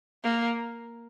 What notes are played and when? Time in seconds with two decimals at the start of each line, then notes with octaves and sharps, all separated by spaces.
0.24 A#3